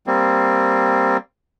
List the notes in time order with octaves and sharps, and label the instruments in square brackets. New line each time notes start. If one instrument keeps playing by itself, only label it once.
[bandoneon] G3 A#3 C4